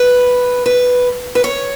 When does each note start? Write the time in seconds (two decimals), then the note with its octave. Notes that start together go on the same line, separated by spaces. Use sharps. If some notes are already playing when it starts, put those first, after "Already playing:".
Already playing: B4
0.66 B4
1.35 B4
1.44 C#5